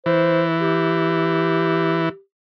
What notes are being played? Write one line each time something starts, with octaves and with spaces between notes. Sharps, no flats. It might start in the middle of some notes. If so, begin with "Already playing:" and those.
E3 C5
G4